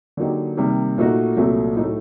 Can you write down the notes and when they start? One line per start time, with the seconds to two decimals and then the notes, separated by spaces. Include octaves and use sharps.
0.17 D3 F#3 A#3 D#4 G4
0.57 C3 D#3 G3 A#3
0.98 A#2 A3 D#4 F#4
1.37 C2 A#2 F#3 A3
1.76 A2 F#3 A3 D#4